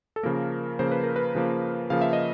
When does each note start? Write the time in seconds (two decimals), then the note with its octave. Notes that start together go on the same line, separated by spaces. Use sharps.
0.16 A4
0.23 C#3 F3 A#3 A#4
0.79 C#3 F3 A#3 C5
0.91 B4
1.04 A#4
1.16 B4
1.35 C#3 F3 A#3
1.90 C#3 F3 A#3 F5
2.01 E5
2.13 D#5